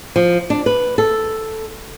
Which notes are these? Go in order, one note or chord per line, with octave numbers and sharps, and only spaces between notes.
F3
D4
B4
A4